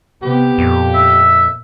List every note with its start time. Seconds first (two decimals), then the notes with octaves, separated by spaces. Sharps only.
0.22 C3 B3 G4
0.58 F2 A#2
0.95 E5